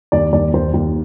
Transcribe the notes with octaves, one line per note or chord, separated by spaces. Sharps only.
D#2 D5
D#2 D5
D#2 C5
D#2